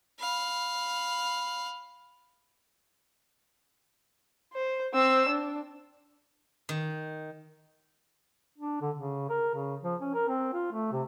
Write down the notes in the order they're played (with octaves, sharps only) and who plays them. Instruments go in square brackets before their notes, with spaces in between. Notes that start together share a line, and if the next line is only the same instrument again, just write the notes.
[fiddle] F5 B5
[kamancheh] C5
C4 E6
D4
[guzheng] D#3
[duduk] D4
D3
C#3
A#4
C#3
F3
C#4
A#4
C4
F4
A3
C3